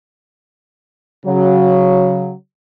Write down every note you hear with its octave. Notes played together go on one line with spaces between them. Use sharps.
C#3 F#3